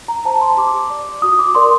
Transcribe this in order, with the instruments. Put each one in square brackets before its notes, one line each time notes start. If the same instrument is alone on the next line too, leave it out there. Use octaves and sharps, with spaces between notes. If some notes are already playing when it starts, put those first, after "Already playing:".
[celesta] A#5
C5 A5
C6
G4 D6
D5
F#4 D#6
D6
A#4 D5 C6